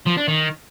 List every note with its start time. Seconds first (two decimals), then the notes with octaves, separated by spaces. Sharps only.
0.07 F3
0.17 D4
0.28 D#3